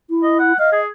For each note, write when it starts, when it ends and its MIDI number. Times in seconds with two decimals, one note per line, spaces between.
0.10 0.53 64
0.23 0.34 75
0.39 0.54 78
0.59 0.80 75
0.59 0.72 77
0.72 0.87 68